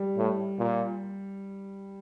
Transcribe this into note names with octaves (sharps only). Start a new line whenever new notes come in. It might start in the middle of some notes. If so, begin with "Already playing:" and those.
Already playing: G3
A2
A#2